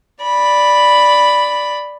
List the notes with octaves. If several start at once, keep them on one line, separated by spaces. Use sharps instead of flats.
D5 B5